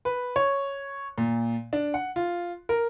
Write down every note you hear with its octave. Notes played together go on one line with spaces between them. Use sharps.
B4
C#5
A#2
D4
F#5
F4
A#4